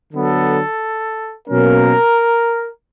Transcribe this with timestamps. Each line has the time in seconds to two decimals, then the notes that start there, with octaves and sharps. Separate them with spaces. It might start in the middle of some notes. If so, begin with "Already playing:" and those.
0.13 D3 F#3 B3 A4
1.48 B2 F#3 A#3 C#4 A#4